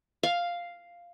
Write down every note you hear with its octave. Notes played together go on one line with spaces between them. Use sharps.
F5